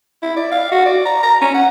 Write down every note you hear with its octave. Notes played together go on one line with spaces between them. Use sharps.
E4
D5
F5
F#4
D5
A#5
A#5
C#4
F#5